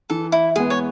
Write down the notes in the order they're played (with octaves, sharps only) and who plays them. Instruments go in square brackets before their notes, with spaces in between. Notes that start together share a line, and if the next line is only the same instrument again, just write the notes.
[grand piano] E3 [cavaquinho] A4
[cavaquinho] E4
[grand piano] G#3 B3 [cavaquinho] G#4
[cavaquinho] C#5